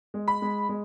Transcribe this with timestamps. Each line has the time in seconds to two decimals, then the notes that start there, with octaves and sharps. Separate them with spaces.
0.14 G#3
0.28 B5
0.42 G#3
0.69 G#3